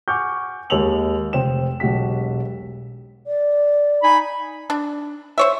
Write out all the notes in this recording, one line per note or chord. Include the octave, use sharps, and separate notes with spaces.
F#5 G#5 C#6 D6 F6 G6
D#2 G#3 D#5 E6 F7 F#7
F1 C5 G5 E7
E1 B1 F#4 G4 B6
D5
D#4 G#5 B5
D4
C5 C#5 E5